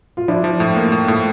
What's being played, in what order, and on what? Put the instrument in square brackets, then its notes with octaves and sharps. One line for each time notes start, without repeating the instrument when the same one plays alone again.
[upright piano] F4
[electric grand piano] F3 [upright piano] D4 E4
[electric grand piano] F3
A2
A#3
A2
A2